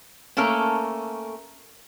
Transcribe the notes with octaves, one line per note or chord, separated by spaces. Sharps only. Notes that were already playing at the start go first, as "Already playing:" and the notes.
A3 A#3 C#4 A4 A#4